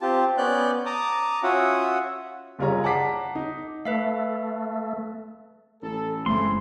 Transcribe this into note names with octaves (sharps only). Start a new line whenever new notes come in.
C4 F4 G4 A5
B3 C#4 D5 F#6 G6
A5 A#5 D6 D#6
C#4 F4 F#4 E5 F#5 D#6
F#1 G3 F4 G#4 C#5 A#5
F#5 A5 A#5 D6 B6 C7
D#4
A3 B4 E5 F5
A1 A4
F#1 C#3 G#3 A3 C4 E4 C6